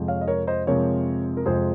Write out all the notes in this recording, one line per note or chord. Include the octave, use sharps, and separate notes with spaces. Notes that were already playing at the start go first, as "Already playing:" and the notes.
Already playing: F2 C3 F3 G#3
C#5 F5
D#5
A#4 C#5
C5 D#5
F2 C3 F3 G#3 A#4 C#5
A#4
F2 C3 F3 G#3 G#4 C5